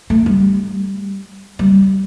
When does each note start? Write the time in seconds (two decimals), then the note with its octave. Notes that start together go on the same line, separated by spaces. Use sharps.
0.10 A3
0.26 G3
1.59 G3